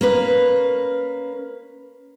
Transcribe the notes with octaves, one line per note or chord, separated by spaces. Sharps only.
A#3 C#4 B4